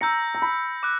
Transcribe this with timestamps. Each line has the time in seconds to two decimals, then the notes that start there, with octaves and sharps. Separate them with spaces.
0.01 A#5 E6 G6 A#6 C#7
0.35 A#5
0.42 B5
0.83 D6 F#6